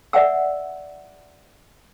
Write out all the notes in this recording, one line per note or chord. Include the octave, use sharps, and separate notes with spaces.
D5 E5 F#5 G#5 E6